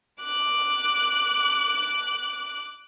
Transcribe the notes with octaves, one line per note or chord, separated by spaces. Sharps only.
D6 F#6